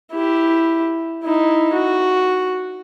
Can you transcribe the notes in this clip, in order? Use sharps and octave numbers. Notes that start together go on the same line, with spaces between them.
E4 G4
D#4 E4
F#4